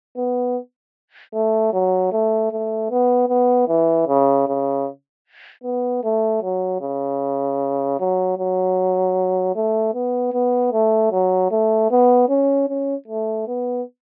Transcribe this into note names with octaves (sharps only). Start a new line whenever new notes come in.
B3
A3
F#3
A3
A3
B3
B3
E3
C#3
C#3
B3
A3
F#3
C#3
F#3
F#3
A3
B3
B3
A3
F#3
A3
B3
C#4
C#4
A3
B3